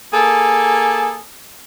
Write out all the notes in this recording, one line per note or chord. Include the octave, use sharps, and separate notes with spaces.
A#3 G#4 A4